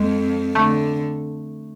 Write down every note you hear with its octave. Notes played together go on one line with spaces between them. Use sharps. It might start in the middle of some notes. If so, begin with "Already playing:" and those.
Already playing: F2 F3 G#3
D3 A3